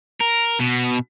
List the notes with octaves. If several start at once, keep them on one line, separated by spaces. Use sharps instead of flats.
A#4
B2